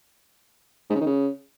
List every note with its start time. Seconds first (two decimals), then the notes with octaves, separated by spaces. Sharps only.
0.90 G#2
0.95 C#3
1.01 D#3
1.06 C#3